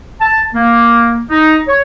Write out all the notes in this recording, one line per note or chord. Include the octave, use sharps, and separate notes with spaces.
A5
A#3
D#4
C#5